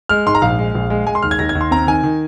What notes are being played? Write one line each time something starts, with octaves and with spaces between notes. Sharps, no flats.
G#3 F6
G#2 C6
A#5
A#1 F5
G#3
A#1
G#3
G#3 G#5
C6
D#2 F6
G#6
D#2 A#6
G#6
D#2
C6
C4 A#5
D#3 G#5
D#3